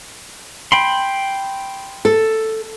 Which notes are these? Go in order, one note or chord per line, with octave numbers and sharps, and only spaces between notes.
G5 B5 C6
A4